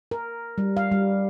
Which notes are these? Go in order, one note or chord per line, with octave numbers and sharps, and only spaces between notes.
A#4
G3
F5
G3